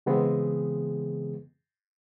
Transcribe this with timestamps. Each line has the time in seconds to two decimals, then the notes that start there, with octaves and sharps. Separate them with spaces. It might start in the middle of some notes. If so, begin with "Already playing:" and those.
0.06 C#3 E3 G#3 B3 C4 G#4